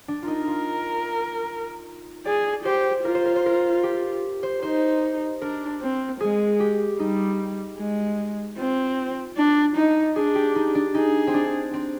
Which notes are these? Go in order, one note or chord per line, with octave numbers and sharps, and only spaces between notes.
D4
F4
D#4 A#4
F4
G#4 D5
G4 C5
F4 A#4
C5
A#4
C5
A#4
G4
C5
D#4 C5
D4 A#4
C4
G#3 G#4
G4
G3 D#4
G#3
C4 F4
D4
D#4
D4 G#4
G4
D#4
D4
D#4 G#4
C4
D4
C4